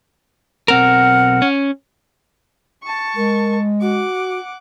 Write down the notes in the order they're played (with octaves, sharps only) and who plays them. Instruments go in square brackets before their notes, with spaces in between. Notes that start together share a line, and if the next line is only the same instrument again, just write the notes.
[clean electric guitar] B1 C4 A#4 [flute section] F#5 F6
[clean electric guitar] C#4
[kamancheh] A5 C#6
[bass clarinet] G#3 [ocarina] A#4
[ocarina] F#4 [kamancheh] F#5 D6